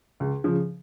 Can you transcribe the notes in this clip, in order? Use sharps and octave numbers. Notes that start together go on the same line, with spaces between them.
C#2
C#3 F3